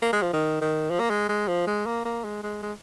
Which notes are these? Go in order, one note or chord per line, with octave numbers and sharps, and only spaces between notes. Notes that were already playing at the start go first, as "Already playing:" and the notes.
A#3
G#3
F3
D#3
D#3
F3
A#3
G#3
G#3
F3
G#3
A#3
A#3
G#3
G#3
G#3